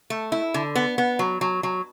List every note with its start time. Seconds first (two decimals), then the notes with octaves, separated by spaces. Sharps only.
0.10 A3
0.32 E4
0.54 D3
0.75 B3
0.98 B3
1.19 F#3
1.41 F#3
1.63 F#3